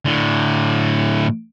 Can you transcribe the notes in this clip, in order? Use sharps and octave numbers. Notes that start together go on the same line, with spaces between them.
A2 D3